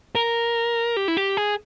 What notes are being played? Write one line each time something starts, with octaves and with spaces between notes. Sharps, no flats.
A#4
G4
E4
G4
G#4